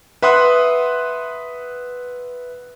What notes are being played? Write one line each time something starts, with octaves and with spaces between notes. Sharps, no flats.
B4 E5 F#5 C6 D#6 F#6